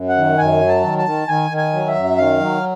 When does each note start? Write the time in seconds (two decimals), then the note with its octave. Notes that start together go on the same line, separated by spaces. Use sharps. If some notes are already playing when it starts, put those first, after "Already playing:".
Already playing: F#2
0.09 F#5
0.16 D#3
0.38 F#2 G#5
0.61 F#3
0.68 A5
0.83 D#3
0.98 A5
1.06 D#3
1.28 D#3 G#5
1.50 D#3
1.57 G#5
1.73 F#3
1.88 E5
1.95 F#2
2.18 D#3 F5
2.40 F#3